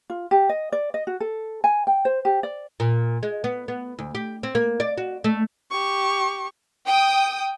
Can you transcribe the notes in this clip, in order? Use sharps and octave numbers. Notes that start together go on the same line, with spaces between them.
F4
G4
D#5
D5
D#5
F#4
A4
G#5
G5
C5
G4
D5
A#2
G#3
B3
B3
D2
G4
C4
A#3
D5
F#4
A3
G4 C#6
G5 D#6